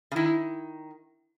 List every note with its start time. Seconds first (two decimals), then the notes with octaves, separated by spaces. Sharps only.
0.12 C#3
0.16 D#3 E4